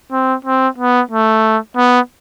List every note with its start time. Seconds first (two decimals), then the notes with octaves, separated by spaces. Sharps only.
0.11 C4
0.44 C4
0.78 B3
1.11 A3
1.77 B3